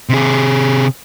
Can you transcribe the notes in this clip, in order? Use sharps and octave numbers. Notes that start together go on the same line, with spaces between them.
C3 G#4